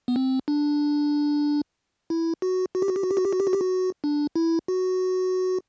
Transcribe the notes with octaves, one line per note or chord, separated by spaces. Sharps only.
B3
C4
D4
E4
F#4
F#4
G4
F#4
G4
F#4
G4
F#4
G4
F#4
G4
F#4
G4
F#4
D4
E4
F#4